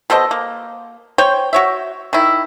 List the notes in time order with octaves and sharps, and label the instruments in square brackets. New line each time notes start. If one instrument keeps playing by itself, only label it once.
[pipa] B2 A4 C5 D#5
A#3
C5 C#5 G5
F#4 C#5 E5
D#3 E4